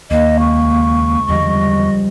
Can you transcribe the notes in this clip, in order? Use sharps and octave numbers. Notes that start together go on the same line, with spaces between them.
D#2 A#3 D#5
C#2 C#6
E2 D3 F3 G3 D#5